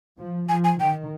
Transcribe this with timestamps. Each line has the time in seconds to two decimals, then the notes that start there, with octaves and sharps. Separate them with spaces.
0.19 F3
0.49 F3 G#5
0.64 G#5
0.80 D#3 G5